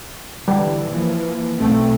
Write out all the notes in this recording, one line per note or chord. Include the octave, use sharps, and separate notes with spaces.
D3 E3 G3
E3 F3 A#3
B1 A3 C4